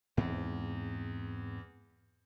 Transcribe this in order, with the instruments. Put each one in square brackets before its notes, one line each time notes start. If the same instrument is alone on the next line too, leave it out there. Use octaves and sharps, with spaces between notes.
[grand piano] E2 [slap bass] G#2 C4